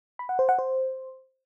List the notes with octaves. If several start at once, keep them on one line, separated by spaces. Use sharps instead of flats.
B5
F#5
C5
F#5
C5